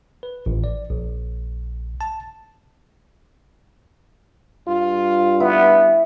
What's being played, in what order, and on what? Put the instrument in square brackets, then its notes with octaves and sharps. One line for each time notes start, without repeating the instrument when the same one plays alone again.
[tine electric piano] B4
A1
D5
A#1
A5
[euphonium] G2 [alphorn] F4
[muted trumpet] B3 [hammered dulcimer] E4